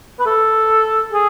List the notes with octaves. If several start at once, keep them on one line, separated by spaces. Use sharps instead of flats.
B4
A4
G#4